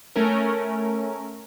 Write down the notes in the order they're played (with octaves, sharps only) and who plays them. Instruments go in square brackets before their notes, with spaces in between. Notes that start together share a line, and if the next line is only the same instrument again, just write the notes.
[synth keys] A3 C#4 A#4